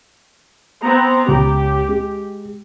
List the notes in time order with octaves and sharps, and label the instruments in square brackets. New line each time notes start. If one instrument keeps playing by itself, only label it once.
[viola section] B3 C4 A#5
[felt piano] C#2 [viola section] G4
[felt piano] G#3